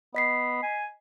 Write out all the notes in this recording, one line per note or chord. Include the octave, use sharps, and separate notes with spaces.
B3 D#5 B6 C7
G#5